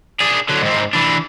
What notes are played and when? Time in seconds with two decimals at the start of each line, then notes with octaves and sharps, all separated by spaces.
0.20 D4 G#4
0.49 D3 F#3
0.62 G#2 C4
0.93 E3 D4